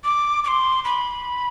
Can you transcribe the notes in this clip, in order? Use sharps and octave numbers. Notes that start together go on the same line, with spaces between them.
D6
D6
C6
B5